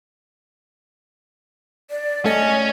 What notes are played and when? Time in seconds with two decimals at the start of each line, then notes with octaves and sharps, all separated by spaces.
1.90 D5
2.25 A3 C#4 D#5